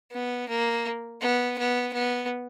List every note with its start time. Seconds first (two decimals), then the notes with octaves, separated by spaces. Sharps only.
0.12 B3
0.49 A#3
1.21 B3
1.58 B3
1.94 B3